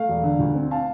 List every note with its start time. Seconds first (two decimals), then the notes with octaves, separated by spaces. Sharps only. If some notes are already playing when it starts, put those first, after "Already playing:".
Already playing: A3 F5
0.08 E1
0.24 D3
0.39 D2
0.55 C4
0.71 F5 A5